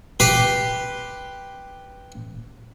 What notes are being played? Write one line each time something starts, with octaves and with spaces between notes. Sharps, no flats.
G4 B4 C6